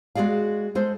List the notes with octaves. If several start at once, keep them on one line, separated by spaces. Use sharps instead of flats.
G#3 F#4 G#4 D5 F5
G#3 A4 C5